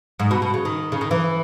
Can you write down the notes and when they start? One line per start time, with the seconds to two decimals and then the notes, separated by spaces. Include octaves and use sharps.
0.19 G#2
0.31 B2
0.42 B2
0.54 C#3
0.65 D#3
0.92 C#3
1.01 D#3
1.11 E3